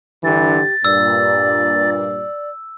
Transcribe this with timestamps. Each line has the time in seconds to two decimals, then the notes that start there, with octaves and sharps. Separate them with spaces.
0.24 G2 D3 E3 G4 A6
0.85 G2 A#2 D5 E6